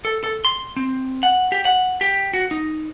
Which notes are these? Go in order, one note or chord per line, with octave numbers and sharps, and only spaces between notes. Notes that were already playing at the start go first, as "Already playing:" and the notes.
A4
A4
C6
C4
F#5
G4
F#5
G4
F#4
D#4